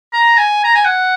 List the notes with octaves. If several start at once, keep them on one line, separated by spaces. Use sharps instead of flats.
A#5
G#5
A#5
G#5
F#5